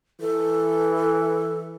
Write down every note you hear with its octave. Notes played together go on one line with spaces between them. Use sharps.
E3 A4